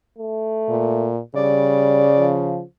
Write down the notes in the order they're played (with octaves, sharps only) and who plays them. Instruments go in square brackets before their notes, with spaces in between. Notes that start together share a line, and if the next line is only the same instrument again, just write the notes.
[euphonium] A3
[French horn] A#2
[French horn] C#3 [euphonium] G3 [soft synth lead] D5
[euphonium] F3